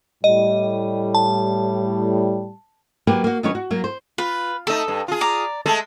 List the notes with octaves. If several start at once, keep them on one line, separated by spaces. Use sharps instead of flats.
A2 G3 D#5
A5
F#3 A#3 F#4 G4 B4
A#3 F#4
D#3 F#3 C#4 D4 B4 C#5
F#4
F#3 A#3
C5
F4 B4
A3 D#4 A4
G2
F4 G#4
D5 A#5 D6
G#3 A3 A4